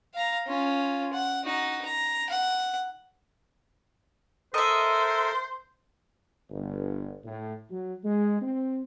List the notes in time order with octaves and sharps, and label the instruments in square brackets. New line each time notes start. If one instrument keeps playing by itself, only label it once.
[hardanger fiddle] F5 A#5
C#4 F4
F#5
D#4 F#4
A#5
F#5
[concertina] A4 A#4 [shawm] C5 [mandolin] D#5 E5
[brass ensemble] G1
A2
F#3
G#3
C4